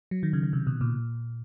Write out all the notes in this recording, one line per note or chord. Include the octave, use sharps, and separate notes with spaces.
F#3
D#3
C#3
C#3
C3
B2
A#2